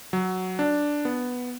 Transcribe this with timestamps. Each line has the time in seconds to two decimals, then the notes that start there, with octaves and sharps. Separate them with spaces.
0.13 F#3
0.59 D4
1.05 B3